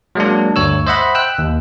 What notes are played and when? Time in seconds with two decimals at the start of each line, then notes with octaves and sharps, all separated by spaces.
0.15 F#3 G#3 A#3 D4
0.56 D2 G2 C#5 E6
0.87 C5 D#5 E5 F#5 B5
1.15 G5 E6 F#6
1.39 D#2